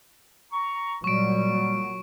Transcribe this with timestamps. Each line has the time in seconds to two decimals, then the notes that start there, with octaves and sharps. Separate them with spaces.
0.52 A#5 C#6
1.04 A#2 F#3 G3 C#6 D7